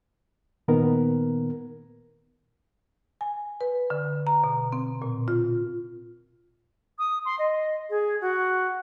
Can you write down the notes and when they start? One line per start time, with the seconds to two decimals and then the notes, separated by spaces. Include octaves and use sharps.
0.68 A#2 D#3 B3 A#4
3.21 G#5
3.61 B4
3.90 D3
4.27 A#5
4.44 B2
4.72 C4
5.02 A#2
5.28 F4
6.98 D#6
7.25 C6
7.38 D#5
7.89 G#4
8.20 F#4